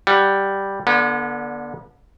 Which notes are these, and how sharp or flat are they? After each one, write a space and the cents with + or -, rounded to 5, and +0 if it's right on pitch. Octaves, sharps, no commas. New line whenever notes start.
G3 +0 F#5 +5
D3 +0 B3 -40